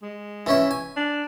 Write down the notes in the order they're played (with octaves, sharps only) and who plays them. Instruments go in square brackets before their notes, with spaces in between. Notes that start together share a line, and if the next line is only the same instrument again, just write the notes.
[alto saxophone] G#3
[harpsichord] E3 C#4 E4
G#5
[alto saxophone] D4